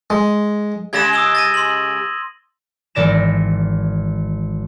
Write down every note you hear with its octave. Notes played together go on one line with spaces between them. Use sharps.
G#3
C#3 G#3 G4 G#6 A#6 E7
D#6 E6 G7
A6 A#6 D#7
C6 F#7
G#1 E3 D5 A#6 E7